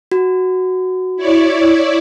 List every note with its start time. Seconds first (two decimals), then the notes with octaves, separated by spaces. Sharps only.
0.12 F#4
1.16 E4 C#5 D5